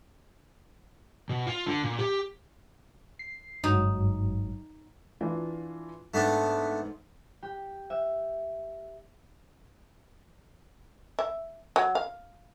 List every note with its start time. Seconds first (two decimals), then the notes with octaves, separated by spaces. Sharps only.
1.29 B2
1.47 F4
1.66 D3
1.83 A#2
1.99 G4
3.19 C7
3.64 G1 G#2 F#3 D#4
5.21 E3 D4 F4
6.14 G#2 A3 B3 D4
7.43 G4
7.90 E5
11.19 E5
11.76 F#3
11.95 F5